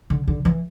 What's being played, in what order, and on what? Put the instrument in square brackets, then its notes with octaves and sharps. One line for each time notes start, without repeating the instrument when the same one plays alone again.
[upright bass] D3
D3
E3